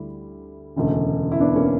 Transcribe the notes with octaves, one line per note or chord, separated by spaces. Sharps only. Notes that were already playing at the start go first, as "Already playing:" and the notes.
Already playing: D2 D3 G3 E4
E1 D2 C#3
E4
B3 D4
A#3 C#4